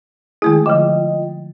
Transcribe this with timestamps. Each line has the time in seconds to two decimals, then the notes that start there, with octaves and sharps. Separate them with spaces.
0.42 D#3 G#3 A3 E4 G#4
0.66 D3 F3 F4 D#5 G5